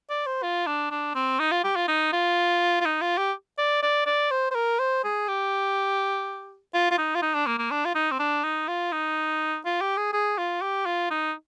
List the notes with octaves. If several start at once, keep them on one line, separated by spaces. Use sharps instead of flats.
D5
C5
F4
D4
D4
C4
D#4
F4
G4
F4
D#4
F4
F4
D#4
F4
G4
D5
D5
D5
C5
C5
A#4
C5
G#4
G4
F4
F4
D#4
F4
D#4
D4
A#3
A#3
D4
F4
D#4
C4
D4
D#4
F4
D#4
F4
G4
G#4
G#4
F4
G4
F4
D#4